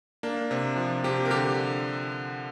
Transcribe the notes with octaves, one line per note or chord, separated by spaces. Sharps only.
A#3 D4
C3
F3
C3 G4
A#4
D3 G4